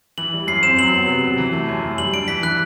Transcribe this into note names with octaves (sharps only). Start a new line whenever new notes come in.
E3 F#7
G3
F#2 C7
C4 E7
F#3 F#7
B3
C3
C3
E3
A3
F#2
F#2
G3 F#7
D4 D7
E3 B6
E3 F#6